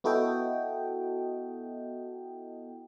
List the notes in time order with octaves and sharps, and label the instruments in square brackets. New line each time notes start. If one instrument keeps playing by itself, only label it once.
[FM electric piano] B3 E4 F#4 A4 D#5 G5